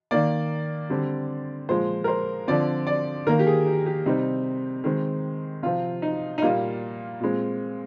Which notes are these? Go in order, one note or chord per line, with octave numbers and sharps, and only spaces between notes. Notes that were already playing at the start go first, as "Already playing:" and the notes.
D#3 A#3 D5
D3 G3 C4
A#2 F3 G#3 C5
A#4
C5
D3 F3 C4 D5
D5
D#3 A#3 A#4
G4
G#4
G4
G4
C3 G3 C4 D#4
D#3 G#3 C4
C3 F3 C4 F4
D#4
D#4
A#2 G3 A#3 F4
A#2 G#3 C4